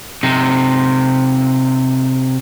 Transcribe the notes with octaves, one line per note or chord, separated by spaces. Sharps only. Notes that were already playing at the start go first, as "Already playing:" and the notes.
C3 D#4